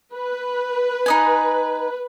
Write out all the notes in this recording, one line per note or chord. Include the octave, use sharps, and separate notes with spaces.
B4
D#4 D#5 G#5